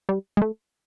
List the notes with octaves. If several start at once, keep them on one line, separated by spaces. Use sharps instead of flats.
G3
G#3
A3